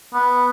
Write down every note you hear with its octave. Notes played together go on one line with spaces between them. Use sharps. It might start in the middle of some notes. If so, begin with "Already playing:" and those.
B3